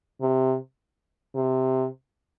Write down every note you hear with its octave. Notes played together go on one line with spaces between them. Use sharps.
C3
C3